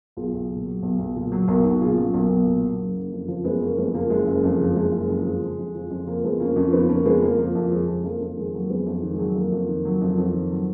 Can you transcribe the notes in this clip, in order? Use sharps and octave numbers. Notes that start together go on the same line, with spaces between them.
B1 F4 G#4
B1
A#2
F#3
B1
B1
A#2
F#3
B1 F#4 A#4
B1 D#4 F#4
A#2 F4 G#4
F#3 C#4 F4
B1 A#3
B1
A#2
F#3
F#1
F#1
F2
F3
F#1 G#3 B3
F#1 A#3 C#4
F2 G#3 B3
F3 A#3
F#1 G#3
F#1
F2
F3
F#1 G#3
F#1
F2
F3
F3
F2
F3
F2
F3 A#3
F2 G#3 B3
F3 A#3 C#4
F2 C#4 F4
F3 B3 D#4
F2 A#3 C#4
F3 G#3 B3
F2 A#3
F3 A#3
F2
F3 G#3
F2
F2 A#3
F2 A#3
D#3 G#3
F#3 A#3
F2 G#3 B3
F2
G#3
D#3
G#3
F#3
F2 A#3
F2
D#3
F#3
F2
F2
D#3
F#3